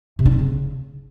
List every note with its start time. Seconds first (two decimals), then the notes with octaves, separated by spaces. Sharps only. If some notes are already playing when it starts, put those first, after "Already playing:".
0.19 C3
0.26 D4
0.32 C4
0.39 C#3